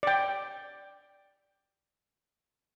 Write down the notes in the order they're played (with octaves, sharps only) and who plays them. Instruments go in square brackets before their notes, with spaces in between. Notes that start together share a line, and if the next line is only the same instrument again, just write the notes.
[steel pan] D5 G5